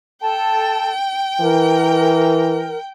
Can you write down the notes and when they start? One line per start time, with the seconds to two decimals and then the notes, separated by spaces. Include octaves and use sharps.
0.22 A4 G5 A5
1.41 E3 A#4